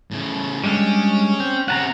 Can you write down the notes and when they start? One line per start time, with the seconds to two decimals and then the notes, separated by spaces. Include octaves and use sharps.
0.11 A2 C#3
0.64 G3 G#3 C#4 D4
1.40 C4
1.68 C3 C#4 F#5 A5 A#5